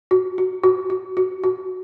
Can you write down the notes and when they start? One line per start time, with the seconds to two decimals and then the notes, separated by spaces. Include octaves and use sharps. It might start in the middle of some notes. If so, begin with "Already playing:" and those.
0.11 F#4
0.38 F#4
0.64 F#4
0.90 F#4
1.17 F#4
1.44 F#4